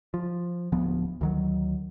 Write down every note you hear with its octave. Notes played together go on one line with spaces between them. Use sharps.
F3
D1 D2 F3 B3
D2 D#3 F#3